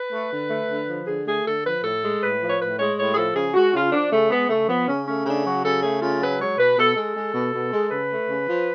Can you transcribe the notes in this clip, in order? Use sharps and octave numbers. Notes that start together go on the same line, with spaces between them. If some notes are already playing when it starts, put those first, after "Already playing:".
Already playing: B4
A3
D3
A3
D3
F3
D3 G#4
A3 G#4
D3 A4
F3 B4
A2 A4
G#3
A2 B4
F3
C#5
A2 B4
G#3 C#5
A2 C#5
G#4
F3 A4
C#3 G#4
G#3 F#4
C#3 F4
F3 D4
C#3 A3
G#3 B3
C#3 A3
F3 B3
C#3 C#4
A3 C#4
C#3 D4
F#3 F#4
C#3 A4
A3 G#4
C#3 F4
F#3 B4
G#3 C#5
B2 B4
B2 A4
G#3 A4
G#3
B2
B2
G#3
C#3 B4
A3
C#3
F3